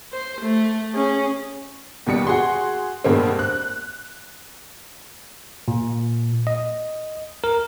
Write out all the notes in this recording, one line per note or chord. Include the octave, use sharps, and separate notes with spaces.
C5
A3
C#4 G#4
D#2 B2 G3 C#7
F#4 G#4 C6
G2 B2 G#3 A#3 C4
F#6
A#2
D#5
A#4